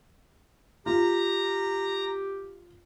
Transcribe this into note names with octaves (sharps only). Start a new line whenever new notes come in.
F4 G4 A#5